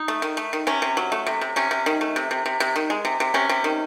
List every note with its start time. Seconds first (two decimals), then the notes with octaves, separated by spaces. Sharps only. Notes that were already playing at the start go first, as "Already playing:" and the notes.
Already playing: D#4
0.08 A3
0.22 D#3
0.37 A3
0.53 D#3
0.67 C3 C#4
0.82 C3
0.97 F#3
1.12 A3
1.27 C3
1.41 C3
1.56 C3 C#4
1.71 C3
1.86 D#3
2.01 A3
2.16 C3
2.31 C3
2.46 C3
2.60 C3
2.76 D#3
2.90 G#3
3.05 C3
3.20 C3
3.34 C3 C#4
3.49 C3
3.64 D#3